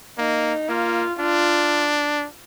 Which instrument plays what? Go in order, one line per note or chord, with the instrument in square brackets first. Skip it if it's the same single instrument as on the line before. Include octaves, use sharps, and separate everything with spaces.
[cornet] A#3 [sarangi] D#4
[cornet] A#3 [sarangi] F4
[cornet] D4 [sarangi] F4